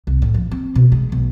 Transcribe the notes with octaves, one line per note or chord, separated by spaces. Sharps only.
C2
A2
F3
C4
B2
G#3
B1